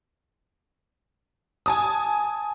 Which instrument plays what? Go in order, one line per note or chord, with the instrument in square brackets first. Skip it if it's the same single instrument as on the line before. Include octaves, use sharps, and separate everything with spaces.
[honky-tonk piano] G#5 A5 D#6